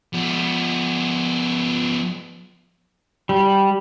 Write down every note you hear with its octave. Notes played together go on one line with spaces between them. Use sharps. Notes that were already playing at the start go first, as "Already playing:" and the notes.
F3 B3
G3